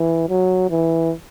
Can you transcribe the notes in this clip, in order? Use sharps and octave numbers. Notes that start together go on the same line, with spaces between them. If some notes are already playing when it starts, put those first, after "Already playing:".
Already playing: E3
F#3
E3